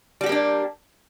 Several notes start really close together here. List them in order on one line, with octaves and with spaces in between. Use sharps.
G3 F#4 G4 A#3 D4